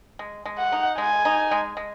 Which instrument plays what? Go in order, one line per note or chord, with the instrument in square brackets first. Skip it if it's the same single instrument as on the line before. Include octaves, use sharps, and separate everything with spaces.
[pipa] G#3
G#3
[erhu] F#5
[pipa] D#4
[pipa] G#3 [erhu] G#5
[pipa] D#4
G#3
G#3